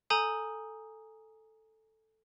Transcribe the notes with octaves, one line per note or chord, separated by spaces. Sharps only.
A4 G#5 A#5 D#6 G6